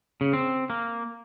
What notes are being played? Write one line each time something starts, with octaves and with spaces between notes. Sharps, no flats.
C#3
C4
A#3